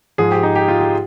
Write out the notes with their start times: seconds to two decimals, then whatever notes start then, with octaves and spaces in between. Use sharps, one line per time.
0.18 G#2 F3 G#4
0.31 G4
0.43 D#4
0.55 G4
0.68 F4
0.80 G4